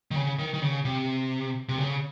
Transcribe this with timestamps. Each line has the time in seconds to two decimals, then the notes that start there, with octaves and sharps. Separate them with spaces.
0.11 D#3
0.16 C#3
0.39 D#3
0.54 D#3
0.62 C#3
0.85 C3
1.69 C3
1.78 C#3